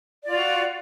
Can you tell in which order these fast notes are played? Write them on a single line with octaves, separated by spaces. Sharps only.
D5 F4 F#4